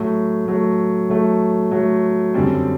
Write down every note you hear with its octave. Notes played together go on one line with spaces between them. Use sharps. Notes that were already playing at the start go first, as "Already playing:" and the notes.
Already playing: A2 F#3 A3
A2 F#3 A3
A2 F#3 A3
A2 F#3 A3
F#2 D3 G3 C4